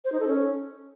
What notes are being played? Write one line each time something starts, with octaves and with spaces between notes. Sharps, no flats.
C5
D#4
A4
C#4